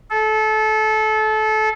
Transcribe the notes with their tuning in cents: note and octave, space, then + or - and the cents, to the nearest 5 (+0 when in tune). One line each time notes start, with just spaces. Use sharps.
A4 -25